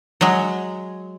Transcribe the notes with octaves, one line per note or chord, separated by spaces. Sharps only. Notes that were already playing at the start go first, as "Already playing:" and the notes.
F#3 G#3